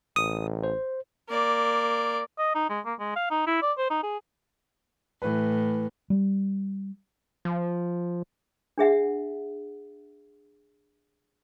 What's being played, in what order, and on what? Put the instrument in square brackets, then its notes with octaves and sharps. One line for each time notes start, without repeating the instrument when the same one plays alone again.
[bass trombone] A1 [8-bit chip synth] D#6
[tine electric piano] C5
[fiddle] A#3 D5
[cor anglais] D#5
D#4
G#3
A#3
G#3
F5
D#4
E4
D5
C5
D#4
G#4
[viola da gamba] A2 [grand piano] E3 B4
[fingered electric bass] G3
[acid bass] F3
[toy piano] D4 G#4 E5 F#5